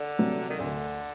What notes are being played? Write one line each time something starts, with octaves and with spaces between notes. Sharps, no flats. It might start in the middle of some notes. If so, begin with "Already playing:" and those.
Already playing: D3
C3 F#3
D#3
D2 D3